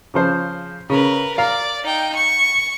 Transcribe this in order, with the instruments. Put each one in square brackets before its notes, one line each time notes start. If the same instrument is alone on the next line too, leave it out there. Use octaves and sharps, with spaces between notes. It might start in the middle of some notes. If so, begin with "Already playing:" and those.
[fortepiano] C#3 F3 C5
[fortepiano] C#3 [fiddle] A#4 B4
[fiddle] D5 [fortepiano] F5 A#5
[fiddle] D#4 G5
C#6